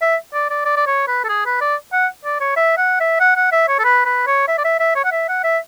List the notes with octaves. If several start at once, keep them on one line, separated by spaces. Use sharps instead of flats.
E5
D5
D5
D5
D5
C#5
B4
A4
G#4
B4
D5
F#5
D5
C#5
E5
F#5
E5
F#5
F#5
E5
C#5
A4
B4
B4
C#5
E5
D5
E5
E5
C#5
F#5
E5
F#5
E5